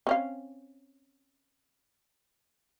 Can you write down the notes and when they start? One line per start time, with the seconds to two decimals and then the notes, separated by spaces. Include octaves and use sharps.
0.07 C4 C#4 F5